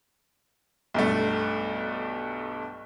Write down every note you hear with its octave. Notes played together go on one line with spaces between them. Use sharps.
B1 G2 A3